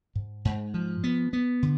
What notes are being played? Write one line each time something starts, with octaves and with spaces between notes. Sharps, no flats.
G#2
G#2
F3
B3
B3
D3